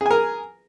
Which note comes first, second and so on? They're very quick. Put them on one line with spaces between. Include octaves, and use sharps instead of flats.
G#4 G#5 A#4